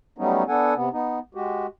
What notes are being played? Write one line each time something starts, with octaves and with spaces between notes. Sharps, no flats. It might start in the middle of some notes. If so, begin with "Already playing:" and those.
F#3 G3 A3 B3 C#4 D#4
B3 D4 A4 F#5 G#5
C3 B3
B3 D#4
G#3 F#4 G4